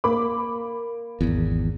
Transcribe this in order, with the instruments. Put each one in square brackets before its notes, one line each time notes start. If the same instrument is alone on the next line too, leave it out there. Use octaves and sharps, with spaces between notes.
[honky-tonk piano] A#3 B5 D6
[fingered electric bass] G#1 E2